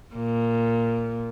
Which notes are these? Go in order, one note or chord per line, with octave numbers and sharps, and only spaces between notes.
A#2